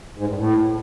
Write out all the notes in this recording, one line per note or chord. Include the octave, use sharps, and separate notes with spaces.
G#2
G2
A2